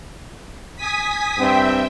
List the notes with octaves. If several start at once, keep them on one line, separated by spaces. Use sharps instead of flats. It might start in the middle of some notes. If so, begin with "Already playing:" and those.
G#5 D#6 B6
G2 C4 E5 G5